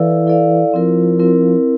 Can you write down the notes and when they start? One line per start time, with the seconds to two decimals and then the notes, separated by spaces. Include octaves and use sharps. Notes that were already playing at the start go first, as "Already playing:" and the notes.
Already playing: E3 E4 A4 D5 F5
0.27 E4 A4 D5 F5
0.73 F3 C4 E4 A#4
1.19 C4 E4 A#4